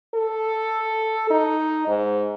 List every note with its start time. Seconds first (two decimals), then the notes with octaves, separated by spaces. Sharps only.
0.15 A4
1.30 D#4
1.88 G#2